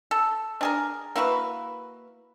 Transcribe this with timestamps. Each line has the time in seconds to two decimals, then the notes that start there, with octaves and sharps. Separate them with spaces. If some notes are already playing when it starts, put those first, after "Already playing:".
0.11 A4
0.61 D4 G#4 A#4
1.16 A#3 E4 F#4 B4